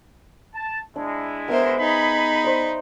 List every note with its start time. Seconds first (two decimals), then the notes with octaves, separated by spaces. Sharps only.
0.55 A5
0.96 G#3 D4 E4
1.48 B3 A#4 C5 D#5 E5
1.79 D#4 G#4 B5
2.44 C5 D5